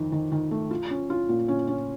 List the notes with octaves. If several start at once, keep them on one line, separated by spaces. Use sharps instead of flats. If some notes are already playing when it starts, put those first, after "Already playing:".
Already playing: F2 D#3
D#3
D#3
A3
F4
C#4
F4
A#2
C#4
C#4